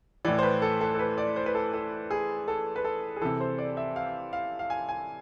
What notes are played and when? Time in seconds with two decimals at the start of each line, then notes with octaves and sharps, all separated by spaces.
0.25 A2 E3 D5
0.39 C5
0.43 B4
0.62 A4
0.81 A4
0.94 A4
0.99 B4
1.18 D5
1.36 C5
1.46 B4
1.55 A4
1.73 A4
2.10 G#4
2.48 A4
2.76 B4
2.84 A4
3.16 G#4
3.21 C3 E3 A4
3.40 C5
3.59 D5
3.77 E5
3.96 F5
4.33 F5
4.59 F5
4.70 G#5
4.89 G#5